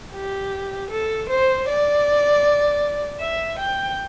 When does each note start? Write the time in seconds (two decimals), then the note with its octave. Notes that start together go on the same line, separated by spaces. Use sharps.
0.14 G4
0.90 A4
1.29 C5
1.67 D5
3.20 E5
3.58 G5